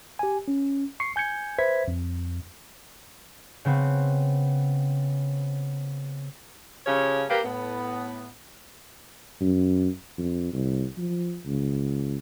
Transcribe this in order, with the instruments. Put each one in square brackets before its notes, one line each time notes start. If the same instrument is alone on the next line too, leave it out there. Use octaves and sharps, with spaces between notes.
[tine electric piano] G4 G#5
C#4
C#6 C7 C#7
G#5 G6 G#6 C#7
B4 C5 E5 G#6 B6
F2
[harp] C#3 B3 C4
[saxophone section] C#3 F3 C#4 G4 G#4 C#5
A#3 G4 B4
A2 B3
[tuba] F#2
F2
C2
F3
C#2